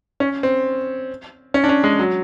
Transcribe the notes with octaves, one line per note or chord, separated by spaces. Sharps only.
C#4
C4
C#4
D4
C#4
G#3
F#3